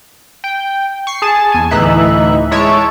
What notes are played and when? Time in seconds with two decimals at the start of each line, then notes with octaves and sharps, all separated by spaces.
0.44 G5
1.07 C#6 C7
1.22 G#4 A5
1.52 E2 G#5
1.71 D2 A2 E3 D#4 E5 F#6
2.51 G#3 E4 C#5 A5 E6 D7